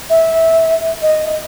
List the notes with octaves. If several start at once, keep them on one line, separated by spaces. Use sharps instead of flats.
E5
D#5